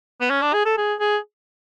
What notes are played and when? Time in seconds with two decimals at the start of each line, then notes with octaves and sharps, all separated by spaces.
0.21 B3
0.30 C#4
0.42 D4
0.53 G#4
0.65 A4
0.78 G#4
1.00 G#4